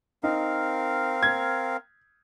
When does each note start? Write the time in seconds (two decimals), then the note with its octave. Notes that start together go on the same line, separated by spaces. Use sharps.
0.23 C4 D#4 A#4 F5
1.23 G#6